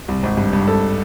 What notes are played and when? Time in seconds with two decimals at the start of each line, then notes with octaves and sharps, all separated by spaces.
0.08 C2
0.23 G#1
0.37 G2
0.53 G2
0.67 G#1 A4